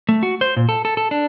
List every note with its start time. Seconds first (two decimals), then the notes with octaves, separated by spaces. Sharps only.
0.09 A3
0.23 F#4
0.41 C5
0.57 A#2
0.69 A4
0.85 A4
0.97 A4
1.11 D4